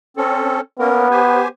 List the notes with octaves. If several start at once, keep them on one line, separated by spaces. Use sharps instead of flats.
C4 C#4 A4
A#3 B3 C#4 A#4
G4 C5 G#5